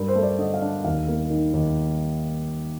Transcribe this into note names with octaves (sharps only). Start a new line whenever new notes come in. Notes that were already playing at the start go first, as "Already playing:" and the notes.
Already playing: G2 A#4
C5
A3
D5
D3 D#5
F5
D4
D#2 F5
A#3
D#3
D#2